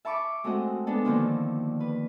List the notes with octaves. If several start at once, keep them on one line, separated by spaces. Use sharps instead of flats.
E5 A5 B5 C#6 D6
G#3 A3 C4 F#4 D#5
G#3 B3 D4 A4
D3 D#3 F3 A#3 C4
B4